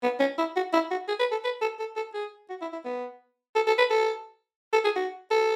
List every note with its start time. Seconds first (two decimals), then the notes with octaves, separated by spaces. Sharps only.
0.03 B3
0.20 C#4
0.38 E4
0.56 F#4
0.73 E4
0.91 F#4
1.08 G#4
1.20 B4
1.32 A4
1.44 B4
1.62 A4
1.79 A4
1.96 A4
2.14 G#4
2.50 F#4
2.62 E4
2.73 E4
2.85 B3
3.56 A4
3.67 A4
3.78 B4
3.90 A4
4.73 A4
4.85 G#4
4.96 F#4
5.31 A4